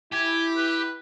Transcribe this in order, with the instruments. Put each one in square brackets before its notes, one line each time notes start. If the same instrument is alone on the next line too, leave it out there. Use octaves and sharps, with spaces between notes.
[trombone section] E4 [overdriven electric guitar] G4 [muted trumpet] G#5
[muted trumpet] B4